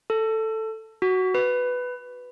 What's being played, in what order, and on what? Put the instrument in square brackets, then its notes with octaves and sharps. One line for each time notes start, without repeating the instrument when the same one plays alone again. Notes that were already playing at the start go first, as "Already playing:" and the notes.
[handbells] A4
F#4
B4